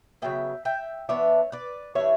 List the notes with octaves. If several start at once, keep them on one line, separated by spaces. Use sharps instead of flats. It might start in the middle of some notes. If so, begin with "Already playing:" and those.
C#3 F#3 B3 E5 G5
E5 G5
E3 B3 D4 C#5 E5
B4 D5
E3 G3 D4 C#5 E5